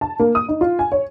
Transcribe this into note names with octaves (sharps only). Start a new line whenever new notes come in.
A5
A#3
D#6
D#4
F4
G#5
C#5